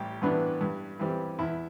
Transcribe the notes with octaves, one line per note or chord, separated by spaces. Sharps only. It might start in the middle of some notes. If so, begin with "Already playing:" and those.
Already playing: A1 G3 G4
G2 E3 B3 D4
G2
E3 G3 C4
E2 E4